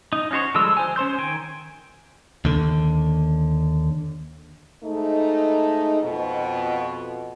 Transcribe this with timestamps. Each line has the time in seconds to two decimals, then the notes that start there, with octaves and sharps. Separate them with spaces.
0.13 D#4
0.31 C#4 D#4 F#4 C5 C#5
0.54 D3 F3 G3 G#3 E6
0.77 C5 G#5
0.96 C#4 C5 C6 G6
1.18 D#3 G5 G#5
2.45 D#2 D3
4.84 G#2 A3 D#4
6.03 F2 B2